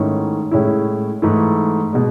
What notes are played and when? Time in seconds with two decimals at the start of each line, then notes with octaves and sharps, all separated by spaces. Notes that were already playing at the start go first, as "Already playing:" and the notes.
Already playing: G#2 D#3 A3 C#4 E4
0.51 A2 G#3 C#4 E4
1.22 G#2 E3 A3 E4
1.93 B2 G#3